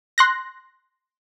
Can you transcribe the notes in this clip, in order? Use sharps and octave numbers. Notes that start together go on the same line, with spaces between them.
C6 F#6 A#6